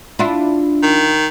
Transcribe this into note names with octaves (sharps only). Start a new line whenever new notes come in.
D4 E4 F4
D#3